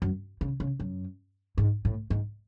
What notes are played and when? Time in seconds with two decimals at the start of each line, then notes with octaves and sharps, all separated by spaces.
0.02 F#2
0.41 C#3
0.60 C#3
0.80 F#2
1.58 G#2
1.85 A2
2.10 G#2